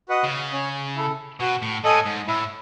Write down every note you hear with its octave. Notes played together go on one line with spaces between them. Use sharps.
F#4 B4 D#5 F#5
C#3
C#4
E4 A4
B2 F#4
A2
A2 A4 D#5 G#5
G#2
A2 E4